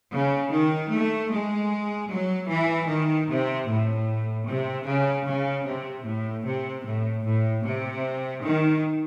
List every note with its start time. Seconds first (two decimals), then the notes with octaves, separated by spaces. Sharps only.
0.12 C#3
0.51 D#3
0.91 A3
1.30 G#3
2.10 F#3
2.49 E3
2.89 D#3
3.28 C3
3.68 A2
4.47 C3
4.86 C#3
5.27 C#3
5.65 C3
6.05 A2
6.45 C3
6.85 A2
7.25 A2
7.64 C3
8.43 D#3